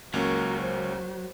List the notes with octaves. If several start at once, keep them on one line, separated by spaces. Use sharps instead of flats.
C#2 F#3 A#3 C#4 F#4 A#4
C5